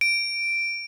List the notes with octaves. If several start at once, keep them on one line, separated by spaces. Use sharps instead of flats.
D7